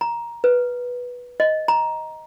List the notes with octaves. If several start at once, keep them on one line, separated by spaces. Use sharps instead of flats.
A#5
B4
D#5
A#5